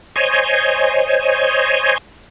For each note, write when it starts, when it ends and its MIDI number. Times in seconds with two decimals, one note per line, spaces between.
0.16 1.98 72
0.16 1.98 73
0.16 1.98 75
0.16 1.98 80